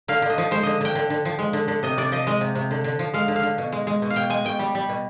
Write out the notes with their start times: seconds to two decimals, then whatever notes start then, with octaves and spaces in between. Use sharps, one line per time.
0.08 D3 F5
0.22 D3
0.30 D#5
0.38 F3
0.51 G#3 C5
0.63 D3 D#5
0.81 D3 G5
0.95 D3
1.10 D3
1.25 F3
1.39 G#3
1.53 D3
1.68 D3
1.83 C3 D#5
1.97 C3 D5
2.12 F3 D#5
2.27 G#3 D#5
2.41 C3
2.55 C3
2.71 D3
2.84 D3
2.99 F3
3.14 G#3 F5
3.28 D3
3.36 F5
3.43 D3
3.58 B2
3.72 G#3
3.87 G#3
4.02 B2
4.10 F5
4.16 B2 G5
4.30 G#3 G#5
4.45 B2 G5
4.59 G3
4.75 G3
4.89 B2